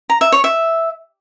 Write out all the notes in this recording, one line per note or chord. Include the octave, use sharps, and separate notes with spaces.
A#5
E5
C#5
E5